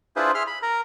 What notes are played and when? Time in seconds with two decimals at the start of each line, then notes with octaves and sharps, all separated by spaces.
0.16 D4 E4 F4 G#4 B4 C5
0.35 G#4 E5 C6 F6
0.47 B5
0.62 A#4 A#5